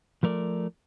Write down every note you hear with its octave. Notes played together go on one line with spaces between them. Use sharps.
F3 A3 A#4 D5